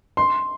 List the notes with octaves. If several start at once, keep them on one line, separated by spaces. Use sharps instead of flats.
C6